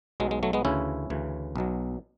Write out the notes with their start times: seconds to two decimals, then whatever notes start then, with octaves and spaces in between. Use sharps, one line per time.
0.20 B1 B2 F#3 G#3
0.31 G#3
0.43 F#3 A3
0.53 G#3 B3
0.65 D2 C#3 E3 C#4 E4
1.10 D2 C#3 E3
1.56 B1 B2 F#3